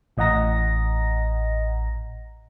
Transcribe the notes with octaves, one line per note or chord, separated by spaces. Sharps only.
A1 A2 D#5 F#5 A#5 A#6